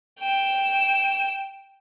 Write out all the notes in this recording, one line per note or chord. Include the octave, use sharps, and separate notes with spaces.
G5 E7